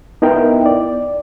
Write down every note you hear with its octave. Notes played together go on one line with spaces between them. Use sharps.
B3 D#4 E4 A#4 G5
D5